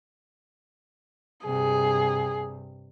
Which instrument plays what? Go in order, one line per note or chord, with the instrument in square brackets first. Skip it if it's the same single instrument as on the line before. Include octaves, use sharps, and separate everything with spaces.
[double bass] G2 C3 [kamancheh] G#4